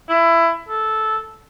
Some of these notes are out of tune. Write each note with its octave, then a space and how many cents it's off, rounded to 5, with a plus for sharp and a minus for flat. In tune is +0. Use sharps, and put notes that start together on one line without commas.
E4 +20
A4 -10